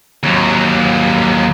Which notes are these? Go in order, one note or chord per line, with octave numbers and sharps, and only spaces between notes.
D#2 F#3